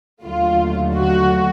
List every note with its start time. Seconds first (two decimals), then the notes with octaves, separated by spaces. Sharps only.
0.24 D#2 D3 F#3 A3 F4
0.97 F#4